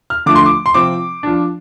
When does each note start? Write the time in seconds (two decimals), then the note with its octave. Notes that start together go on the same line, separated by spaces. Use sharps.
0.10 F6
0.26 D3 F3 A3 D6
0.36 C6
0.46 D6
0.66 C6
0.74 C3 F3 C4 D6
1.23 F3 D4